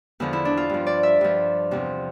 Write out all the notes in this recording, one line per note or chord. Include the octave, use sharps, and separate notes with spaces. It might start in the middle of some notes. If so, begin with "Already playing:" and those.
E2 D3 F3 E4
E4
D4
F4
G2 F3
D5
E5
G2 F3
E2 C3 F3